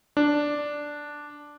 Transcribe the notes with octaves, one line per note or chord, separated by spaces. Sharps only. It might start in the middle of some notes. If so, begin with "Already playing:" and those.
D4